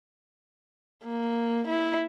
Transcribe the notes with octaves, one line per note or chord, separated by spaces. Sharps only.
A#3
E4